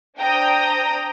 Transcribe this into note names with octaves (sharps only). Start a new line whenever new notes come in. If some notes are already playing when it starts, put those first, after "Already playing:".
D4 C5 G5 A#5 D#6 A#6